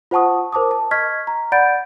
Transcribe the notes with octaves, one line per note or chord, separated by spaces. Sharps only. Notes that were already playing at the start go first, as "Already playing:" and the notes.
F4 C5 F#5 A5 C#6 D#6
A#4 C5 A5 D6 D#6
A5
D#5 C#6 F6 G#6 B6
A#5
D5 F#5 B5 G6 A6 D7